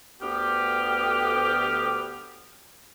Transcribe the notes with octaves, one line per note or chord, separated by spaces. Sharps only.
D2 B3 G4 F6